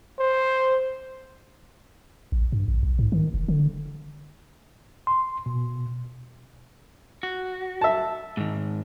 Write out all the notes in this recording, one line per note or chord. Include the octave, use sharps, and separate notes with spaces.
C5
A1
G2
A1
B1
G#2
D#3
F1
D3
C6
B2
F#4
E5 A5
G#2 D#3